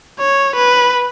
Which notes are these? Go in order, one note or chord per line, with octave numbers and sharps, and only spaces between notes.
C#5
B4